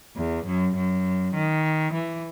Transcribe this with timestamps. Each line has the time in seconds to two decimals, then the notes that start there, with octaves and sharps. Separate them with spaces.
0.16 E2
0.46 F#2
0.75 F#2
1.35 D#3
1.93 E3